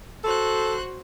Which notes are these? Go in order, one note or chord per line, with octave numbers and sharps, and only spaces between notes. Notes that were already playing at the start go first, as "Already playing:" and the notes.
F#4 A4 C5 F#6